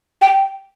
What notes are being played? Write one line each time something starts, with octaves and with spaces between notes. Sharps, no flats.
G5